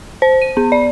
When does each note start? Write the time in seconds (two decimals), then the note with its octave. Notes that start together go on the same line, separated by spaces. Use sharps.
0.22 C5
0.42 D#7
0.57 B3
0.72 D5